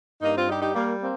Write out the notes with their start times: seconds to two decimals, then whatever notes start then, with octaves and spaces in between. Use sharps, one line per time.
0.22 G2 A#3 D#4
0.35 C4 F4
0.48 G3 D#4 G4
0.61 D#4 G4
0.74 G3 A#3
1.00 A#3 C4